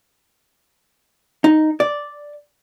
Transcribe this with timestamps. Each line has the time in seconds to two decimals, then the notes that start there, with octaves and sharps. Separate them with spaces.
1.44 D#4
1.80 D5